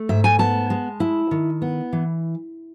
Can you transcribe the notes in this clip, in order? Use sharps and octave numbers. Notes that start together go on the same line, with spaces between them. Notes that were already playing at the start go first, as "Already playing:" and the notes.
Already playing: A3
G#2 E5
G#5
B3 A5
G#3
E4
D#3
B3
E3